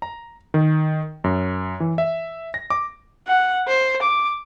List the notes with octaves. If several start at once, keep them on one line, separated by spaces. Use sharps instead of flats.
A#5
D#3
F#2
E3
E5
A#6
D6
F#5
C5
D6